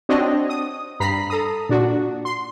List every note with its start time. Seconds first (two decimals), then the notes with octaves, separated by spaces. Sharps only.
0.09 C4 D4 F#4 C#5 D#5
0.49 D#6
1.00 G2 A#5 B5 B6 C7
1.30 A4 A#5 D#6
1.69 A#2 D4 F#4
2.25 C6